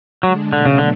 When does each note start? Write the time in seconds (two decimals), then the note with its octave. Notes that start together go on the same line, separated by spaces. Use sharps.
0.23 D3 F#3 G#3 D4
0.53 B2 D3 F#3 A3 D4
0.66 C#3
0.78 D3